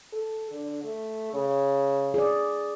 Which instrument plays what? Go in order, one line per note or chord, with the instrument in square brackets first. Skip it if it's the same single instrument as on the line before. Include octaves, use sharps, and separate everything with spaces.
[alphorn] A4
D3
A3
C#3
[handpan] G#4 D5